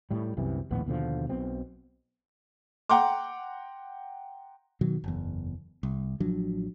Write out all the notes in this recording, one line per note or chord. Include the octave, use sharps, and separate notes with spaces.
A2 G3
C2 F#2 C3 E3
A#1 D#2 A2 B3
D#2 B2 D3 F3
B1 B2 C4
F#5 G5 A#5 C6 D6
B2 D#3 F#3
F#1 E2
C2
A1 F3 F#3 D4